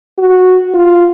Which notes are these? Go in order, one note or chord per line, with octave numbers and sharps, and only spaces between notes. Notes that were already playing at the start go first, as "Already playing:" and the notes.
F#4
F4